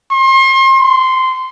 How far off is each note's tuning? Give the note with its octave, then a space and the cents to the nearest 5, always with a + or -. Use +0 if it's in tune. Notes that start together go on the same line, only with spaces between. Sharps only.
C6 +35
C6 -15